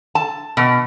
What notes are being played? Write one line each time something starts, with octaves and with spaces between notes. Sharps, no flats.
A5
B2